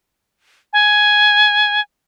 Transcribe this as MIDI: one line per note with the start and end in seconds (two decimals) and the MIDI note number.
0.73 1.81 80